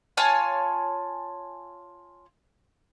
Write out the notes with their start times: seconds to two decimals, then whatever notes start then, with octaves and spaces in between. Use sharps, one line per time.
0.17 F4 C#5 G#5 A5